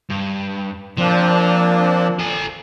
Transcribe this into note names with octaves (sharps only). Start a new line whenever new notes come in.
G2
F3 A#3 C4 D4
A4 G#5